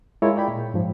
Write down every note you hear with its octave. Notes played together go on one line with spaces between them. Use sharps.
G#3 E4 F4 A#4 C#5
D5 G5 B5
A#2
G#2 F3